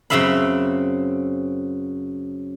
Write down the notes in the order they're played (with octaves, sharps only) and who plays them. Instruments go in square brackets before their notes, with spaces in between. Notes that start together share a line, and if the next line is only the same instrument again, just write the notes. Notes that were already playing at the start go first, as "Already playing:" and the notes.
[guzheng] F#2 C#3 C4 E5 F5 B5